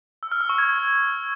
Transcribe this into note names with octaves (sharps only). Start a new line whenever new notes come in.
E6
F6
E6
C#6
G#6